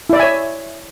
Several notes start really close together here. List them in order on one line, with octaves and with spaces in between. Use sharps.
E4 D5 E5 G#5 C#5